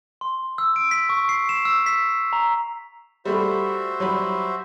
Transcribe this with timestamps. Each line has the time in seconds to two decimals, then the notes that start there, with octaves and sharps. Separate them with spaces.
0.21 C6
0.58 E6
0.76 D7
0.91 B6
1.09 C#6
1.29 C7
1.49 E7
1.65 E6
1.86 B6
2.33 A#5
3.25 G3 A3 F#4 C5 E5 B5
4.00 F#3 G3 B5